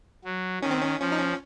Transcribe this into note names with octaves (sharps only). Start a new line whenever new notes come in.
F#3
D#3 C#4
C4
C#4
F3 C#4
D#4
C#4